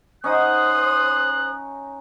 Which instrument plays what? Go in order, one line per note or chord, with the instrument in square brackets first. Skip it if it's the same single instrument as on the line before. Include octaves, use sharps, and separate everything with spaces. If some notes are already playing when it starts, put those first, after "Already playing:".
[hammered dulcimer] C#4 D#4 F#5 [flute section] C5 D#6 [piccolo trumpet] F#6